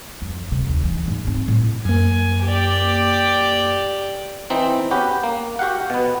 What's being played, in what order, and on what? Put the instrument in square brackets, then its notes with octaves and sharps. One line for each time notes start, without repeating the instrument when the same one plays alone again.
[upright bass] F2
C3
D#2
E3
G#2
C4
A2
[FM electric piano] F#2 A#3 [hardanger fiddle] G#5
[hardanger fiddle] G4 D5
[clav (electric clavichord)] E3 C4 D#4
B3 C#4 F#4 G4 B4
A#3
F#4 G4 F5 F#5
B2 B3